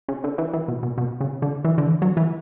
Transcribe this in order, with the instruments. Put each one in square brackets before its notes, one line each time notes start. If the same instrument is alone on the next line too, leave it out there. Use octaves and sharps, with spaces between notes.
[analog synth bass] C#3
D3
E3
E3
B2
B2
B2
C#3
D3
E3
D3
E3
F#3
E3